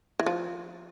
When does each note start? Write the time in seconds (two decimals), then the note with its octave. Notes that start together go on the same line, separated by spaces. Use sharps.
0.20 E3
0.26 F3